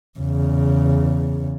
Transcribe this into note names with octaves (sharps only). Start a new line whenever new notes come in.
E2 C#3